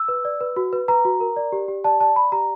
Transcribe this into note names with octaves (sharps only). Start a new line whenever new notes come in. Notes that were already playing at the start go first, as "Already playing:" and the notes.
Already playing: E6
B4
D5
B4
F#4
B4
B4 A#5
F#4
A#4
D5
G4
G4
D5 A5
D5 A5
D5 B5
G4 A#5